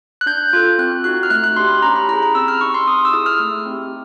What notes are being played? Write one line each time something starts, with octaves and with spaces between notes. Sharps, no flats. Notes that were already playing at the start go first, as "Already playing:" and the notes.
F#6
D4 G6
F4 A4
C4 F#6
D#4 F#4 F#6
F6
A3 F#6
F#6
D4 G4 C6
B5
C#4 A#5
B5
E4 G#4 A#5
A#5
C4 E6
F6
D#4 G4 C#6
C6
C4 D#6
E6
E4 G#4 D#6
F6
A3
C4 D#4 G4